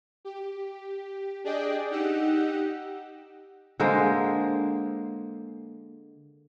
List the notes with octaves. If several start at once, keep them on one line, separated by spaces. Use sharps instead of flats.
G4
D4 G#4 D5 D#5 G5 D6
D#4 G4 F#5 E6
D3 G#3 A#3 C5